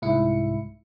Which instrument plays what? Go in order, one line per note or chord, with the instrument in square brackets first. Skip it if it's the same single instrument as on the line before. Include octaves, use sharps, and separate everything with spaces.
[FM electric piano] C2 G#2 E4 C#7